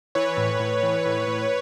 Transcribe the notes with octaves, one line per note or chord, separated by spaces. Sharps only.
E3 B4 C#5
A2
A2
E3
A2
A2